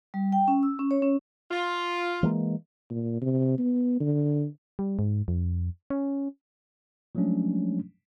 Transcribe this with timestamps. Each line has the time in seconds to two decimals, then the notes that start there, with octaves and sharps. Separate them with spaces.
0.14 G3
0.32 G5
0.48 C#4
0.63 E6
0.79 C#4
0.91 C#5
1.02 C#4
1.50 F4
2.23 E3 G#3 A#3
2.90 A#2
3.21 C3
3.59 B3
4.00 D3
4.79 G3
4.99 G#2
5.28 F2
5.90 C#4
7.15 F3 F#3 G#3 A3 C#4 D4